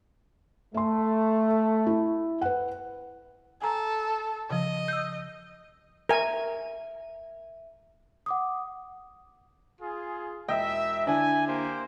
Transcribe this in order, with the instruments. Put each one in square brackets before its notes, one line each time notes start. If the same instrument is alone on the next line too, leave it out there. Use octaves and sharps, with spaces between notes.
[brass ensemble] A3 [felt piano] E5 C6
[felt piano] E4
B4 F#5
[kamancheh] A4 [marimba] G#5 A#5
[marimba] C#3 F3 [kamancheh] D#5
[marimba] E6 G6
[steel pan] A#4 G#5 [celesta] E5
[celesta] F#5 D6 D#6
[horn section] F4 G#4
[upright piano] E1 D#5 G5 [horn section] E5
[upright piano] D3 D4 E4 [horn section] G#5
[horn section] A#3 G4 C5